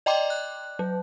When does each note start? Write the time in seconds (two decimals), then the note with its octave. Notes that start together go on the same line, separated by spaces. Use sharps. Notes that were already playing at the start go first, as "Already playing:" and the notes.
0.06 D5 D#5 G5 A#5 C6 D6
0.30 F#6
0.79 F#3